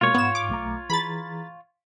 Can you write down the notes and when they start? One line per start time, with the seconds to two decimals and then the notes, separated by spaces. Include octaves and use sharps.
0.01 B2 G#3 A#3 F4 C#5
0.14 G#2 B3 E7
0.35 D6
0.49 B1 A3 A#5
0.90 E3 G#4 A#5 B5 A6